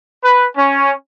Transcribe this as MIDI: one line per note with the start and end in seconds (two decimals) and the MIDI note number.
0.23 0.45 71
0.57 0.92 61